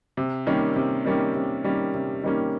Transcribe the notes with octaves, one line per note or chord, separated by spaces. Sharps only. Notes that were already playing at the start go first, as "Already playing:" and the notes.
C3
D#3 G3 A#3 C#4
C3
D#3 G3 A#3 C#4
C3
D#3 G3 A#3 C#4
C3
D#3 G3 A#3 C#4